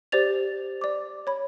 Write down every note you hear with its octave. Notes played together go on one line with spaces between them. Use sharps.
G4 C5 D5 A6 F7
D5 D6
C#5 B5